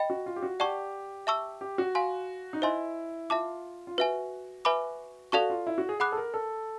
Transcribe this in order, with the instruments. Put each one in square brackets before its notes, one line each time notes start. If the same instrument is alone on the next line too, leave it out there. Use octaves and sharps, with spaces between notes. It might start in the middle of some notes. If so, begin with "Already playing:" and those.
Already playing: [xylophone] D#5 G5 B5
[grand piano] F#4
F4
G4
F#4
[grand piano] G4 [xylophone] D5 F#5 A5 C#6
[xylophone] E5 A5 C#6 E6
[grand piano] G4
F#4
[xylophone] F5 G#5 C6
[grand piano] D#4
[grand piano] E4 [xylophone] C5 D#5 G#5 C6
[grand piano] F4 [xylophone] E5 A5 D6
[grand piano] F4
[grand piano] F#4 [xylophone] B4 E5 G#5
[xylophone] B4 E5 G#5 B5 D6
[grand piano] F#4 [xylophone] A4 D5 F5 A5 C#6
[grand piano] F4
E4
F#4
G#4
[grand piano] G#4 [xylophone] F#5 B5 D6 F#6
[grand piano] A4
A#4
A4